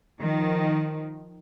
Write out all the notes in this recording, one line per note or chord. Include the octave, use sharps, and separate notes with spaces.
D#3 F3